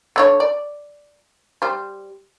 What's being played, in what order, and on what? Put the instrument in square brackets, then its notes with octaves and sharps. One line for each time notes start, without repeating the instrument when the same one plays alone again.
[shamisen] D3 E4 C#5
D5
G3 C5